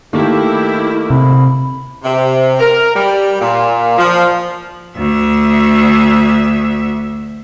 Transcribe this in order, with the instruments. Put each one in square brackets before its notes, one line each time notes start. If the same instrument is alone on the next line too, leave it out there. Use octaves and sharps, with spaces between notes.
[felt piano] D#3 A3 A#3 [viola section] E4 [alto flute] G4
[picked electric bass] C3 [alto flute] B5
[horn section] C3
A#4
G3
A#2
F3
[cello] D2 E5